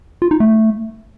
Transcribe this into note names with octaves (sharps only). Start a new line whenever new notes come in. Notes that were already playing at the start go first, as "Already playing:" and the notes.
F4
D#4
A3